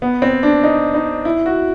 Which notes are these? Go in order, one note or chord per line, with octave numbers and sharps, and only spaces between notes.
B3
C4
D4
D#4
D#4
E4
F#4